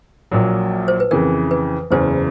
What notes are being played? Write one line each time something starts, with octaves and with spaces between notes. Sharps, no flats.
A#1 A#2 F#3
C5
B4
F2 C#3 E3 A#4
B4
F#1 E2 C#3 C5